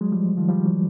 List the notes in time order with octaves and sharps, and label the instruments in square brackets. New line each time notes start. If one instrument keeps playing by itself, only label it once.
[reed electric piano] F#3 G#3
F3 G3
D#3 F3
F3 G3
E3 F#3